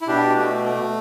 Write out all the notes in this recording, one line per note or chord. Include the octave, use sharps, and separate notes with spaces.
E4
B2 D4 G4
A3
A3